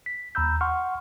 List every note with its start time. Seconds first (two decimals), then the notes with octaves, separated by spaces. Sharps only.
0.06 B6
0.35 D#2 A#5 B5 E6 G6
0.61 F#5 C6 C#6 F6